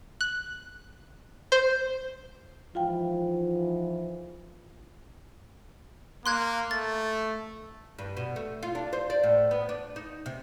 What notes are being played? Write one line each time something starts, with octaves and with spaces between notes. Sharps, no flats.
F#6
C5
G#2 E3 F3 F4 F5 G5
A#3 C6 F#6 G#6
A3 A6
G2
B2
A3
F4
D4
C5
D5
A2
B3
D4
D#4
C3